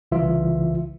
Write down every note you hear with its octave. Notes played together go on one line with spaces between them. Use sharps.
C2 C#3 E3 F4 E5